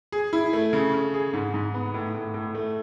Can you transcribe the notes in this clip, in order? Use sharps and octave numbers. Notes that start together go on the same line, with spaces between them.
G#4
E4
A3
C#3
C#3
G#4
G#2
G#2
B3
A2
A2
A2
A3